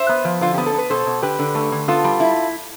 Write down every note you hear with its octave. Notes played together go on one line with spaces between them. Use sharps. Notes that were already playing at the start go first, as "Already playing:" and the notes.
Already playing: C5 E5
B3
F3
D3 F4
B3 G4
A4
B3 B4
B2 A4 C5
B2
D3 G4 B4
D3
A3
D3
B3 F4 A4
G3
E4